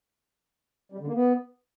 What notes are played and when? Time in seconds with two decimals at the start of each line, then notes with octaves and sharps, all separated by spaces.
0.92 G3
0.99 D3
1.07 A#3
1.14 B3